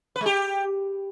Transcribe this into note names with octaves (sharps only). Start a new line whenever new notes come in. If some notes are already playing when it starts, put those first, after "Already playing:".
B4
G#3
G4